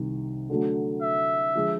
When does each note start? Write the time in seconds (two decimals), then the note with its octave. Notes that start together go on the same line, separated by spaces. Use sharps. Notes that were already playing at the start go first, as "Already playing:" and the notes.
Already playing: C2 C3 D#3
0.49 D3 F#3 A3
1.02 E5
1.55 D3 F3 G#3